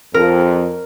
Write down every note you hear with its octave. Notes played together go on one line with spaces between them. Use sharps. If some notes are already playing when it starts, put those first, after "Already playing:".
F2 A#4